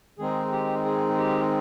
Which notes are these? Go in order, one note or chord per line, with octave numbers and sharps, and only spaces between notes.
D#3 G#3 C4 D#4 G#4
G4
G#4
G4